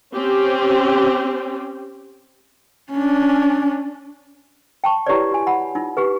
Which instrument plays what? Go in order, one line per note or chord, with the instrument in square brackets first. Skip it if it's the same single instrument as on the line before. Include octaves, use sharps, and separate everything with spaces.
[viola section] C4 C#4 G4
[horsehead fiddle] C#4 D4
[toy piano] G5 A5 C#6
E4 G4 G#4 B4 C#5 D5
F#4 G#5
F#5 B5
D#4 F4
G4 G#4 B4